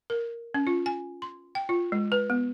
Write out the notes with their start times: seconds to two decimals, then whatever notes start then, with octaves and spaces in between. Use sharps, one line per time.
0.10 A#4
0.54 C#4
0.67 F4
0.86 G#5
1.22 C6
1.55 G5
1.69 F4
1.92 G#3
2.12 B4
2.30 B3